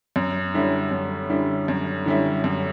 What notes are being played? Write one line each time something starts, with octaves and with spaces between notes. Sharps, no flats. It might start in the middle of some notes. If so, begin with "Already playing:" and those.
F#2
D3 G3 C#4 E4
F#2
D3 G3 C#4 E4
F#2
D3 G3 C#4 E4
F#2